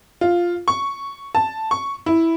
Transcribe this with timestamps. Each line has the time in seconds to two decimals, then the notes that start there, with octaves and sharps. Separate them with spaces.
0.21 F4
0.68 C#6
1.35 A5
1.71 C#6
2.06 E4